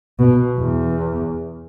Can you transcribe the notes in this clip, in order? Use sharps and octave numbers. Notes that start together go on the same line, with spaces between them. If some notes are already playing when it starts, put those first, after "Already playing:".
B2
E2